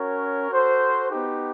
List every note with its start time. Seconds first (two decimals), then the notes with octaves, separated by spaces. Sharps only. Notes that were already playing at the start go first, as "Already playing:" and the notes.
Already playing: C#4 F#4 A#4 C#5
0.50 F#4 A4 C5
1.09 B3 D#4 G4